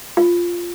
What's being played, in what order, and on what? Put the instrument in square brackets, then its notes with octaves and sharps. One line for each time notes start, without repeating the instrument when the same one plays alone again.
[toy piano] F4